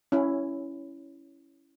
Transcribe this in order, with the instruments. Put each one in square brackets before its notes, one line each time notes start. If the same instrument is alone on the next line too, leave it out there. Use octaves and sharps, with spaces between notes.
[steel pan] C#4 E4